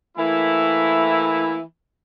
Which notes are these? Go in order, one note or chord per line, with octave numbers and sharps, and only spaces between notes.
E3 A3 A#3 E4